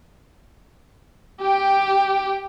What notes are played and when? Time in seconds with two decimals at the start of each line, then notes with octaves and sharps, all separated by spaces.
1.41 G4 G5